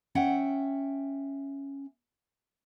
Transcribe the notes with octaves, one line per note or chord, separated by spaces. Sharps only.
C#4 E5 F#5 G5